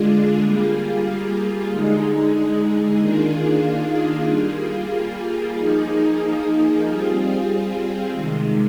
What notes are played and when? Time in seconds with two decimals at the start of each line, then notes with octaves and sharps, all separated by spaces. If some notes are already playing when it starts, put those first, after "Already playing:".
Already playing: D3 G#3 D4 F4 G#4
0.42 G3 A#3 F4 G#4
1.70 D3 G#3 D#4 G#4
2.99 D#3 A#3 D4 F4 G#4
4.27 G3 A#3 F4 G#4
5.55 F3 A#3 D#4 G#4
6.84 G3 C4 F4 G#4
8.12 C3 D#3 G#3